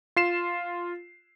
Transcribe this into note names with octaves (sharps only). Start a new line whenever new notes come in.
F4 C7 E7